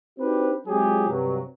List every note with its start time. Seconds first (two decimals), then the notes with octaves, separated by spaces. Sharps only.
0.19 C4 D4 D#4 F#4 G4 B4
0.67 F#3 G#3 C4 F4 G4 G#4
1.09 G2 C3 F#3